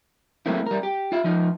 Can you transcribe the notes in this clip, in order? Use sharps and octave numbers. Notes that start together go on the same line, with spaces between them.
F#3 A3 A#3 C4 E4
G3 A#4
G4
F4 E5
F3 D#4